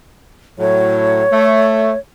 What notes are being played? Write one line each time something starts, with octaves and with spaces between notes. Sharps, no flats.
A2 F#3 C#5
A3